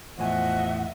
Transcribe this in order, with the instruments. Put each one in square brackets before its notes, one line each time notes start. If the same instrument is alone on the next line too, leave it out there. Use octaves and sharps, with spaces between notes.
[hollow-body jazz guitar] E2 A2 G#5 [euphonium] F3 [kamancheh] D#5 E5 [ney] F#5